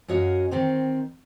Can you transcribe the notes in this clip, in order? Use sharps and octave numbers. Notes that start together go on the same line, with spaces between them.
F#2 F#4 C#5 D#5 F5
D#3 C4 C5